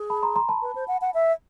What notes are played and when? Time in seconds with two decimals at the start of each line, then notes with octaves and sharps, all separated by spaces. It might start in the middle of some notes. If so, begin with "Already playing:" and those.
Already playing: G#4
0.10 A5 B5
0.23 A#5 C6
0.36 A#5 C6
0.49 A5 B5
0.62 B4
0.75 C5
0.88 F#5
1.01 F#5
1.14 E5